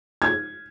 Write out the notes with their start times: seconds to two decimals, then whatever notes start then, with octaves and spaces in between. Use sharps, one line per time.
0.22 G#6